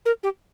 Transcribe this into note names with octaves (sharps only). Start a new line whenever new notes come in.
A#4
G4